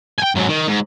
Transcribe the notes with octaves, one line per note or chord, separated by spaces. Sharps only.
G5 G#5
G#2 F#3
D#3
G#2